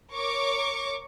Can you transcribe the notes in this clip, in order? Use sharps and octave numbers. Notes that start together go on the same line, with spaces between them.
A#4 C#5 C#6 D6